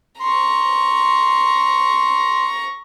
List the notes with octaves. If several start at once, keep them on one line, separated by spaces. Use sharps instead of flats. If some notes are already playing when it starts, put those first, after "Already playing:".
A#5 C6 C#6